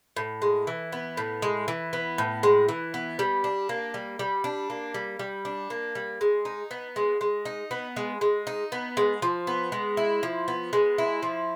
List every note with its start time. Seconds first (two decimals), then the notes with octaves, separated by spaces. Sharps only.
0.17 A2
0.42 G#3
0.67 E3
0.92 B3
1.17 A2
1.42 G#3
1.68 E3
1.93 B3
2.18 A2
2.43 G#3
2.69 E3
2.94 B3
3.19 G3
3.44 D4
3.69 A#3
3.94 G3
4.19 G3
4.44 D4
4.70 A#3
4.94 G3
5.19 G3
5.45 D4
5.70 A#3
5.95 G3
6.21 G#3
6.45 D#4
6.71 B3
6.96 G#3
7.21 G#3
7.45 D#4
7.71 B3
7.96 G#3
8.21 G#3
8.47 D#4
8.72 B3
8.97 G#3
9.22 F3
9.47 B3
9.72 G#3
9.97 E4
10.23 F3
10.48 B3
10.73 G#3
10.98 E4
11.23 F3